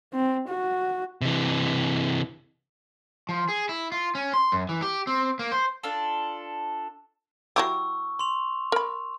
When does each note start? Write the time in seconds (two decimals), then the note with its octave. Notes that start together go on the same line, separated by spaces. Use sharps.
0.14 C4
0.49 F#4
1.21 C3 E3
3.29 F3
3.49 G#4
3.69 E4
3.92 F4
4.15 C#4
4.34 C6
4.52 F#2
4.69 E3
4.82 G4
5.07 C4
5.39 A#3
5.52 C5
5.83 D4 F4 A4
7.56 F#3 E4 G4 C#6 E6
8.19 C6 F7
8.72 A#4 B5